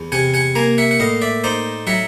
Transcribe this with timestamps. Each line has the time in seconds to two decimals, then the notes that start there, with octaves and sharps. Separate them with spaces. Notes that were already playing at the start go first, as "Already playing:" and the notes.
Already playing: E2
0.12 C3 F#5 G#5
0.34 F#5 G#5
0.55 A#3 G#5 A#5
0.78 E5 F#5
0.91 F#5
1.00 A2 D#5 F5
1.22 D5 E5
1.44 D#4 C5 D5
1.87 F#3 E5 F#5